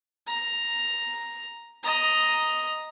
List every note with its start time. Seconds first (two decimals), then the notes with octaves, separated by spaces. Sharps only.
0.27 A#5
1.83 D#5 A#5